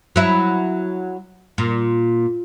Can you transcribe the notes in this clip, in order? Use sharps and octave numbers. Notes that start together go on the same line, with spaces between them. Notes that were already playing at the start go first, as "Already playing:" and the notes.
F#3 E4
A#2